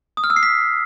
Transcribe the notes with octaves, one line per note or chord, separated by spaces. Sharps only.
D#6
F6
E6
C7
B6